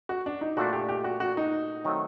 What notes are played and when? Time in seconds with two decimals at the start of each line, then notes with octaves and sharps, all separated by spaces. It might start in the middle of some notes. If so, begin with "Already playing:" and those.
0.09 F#4
0.26 D4
0.41 D#4
0.57 A#2 A3 D4 F#4
0.73 G4
0.89 G4
1.04 F#4
1.20 F#4
1.37 D#4
1.85 D#3 F#3 A3 C4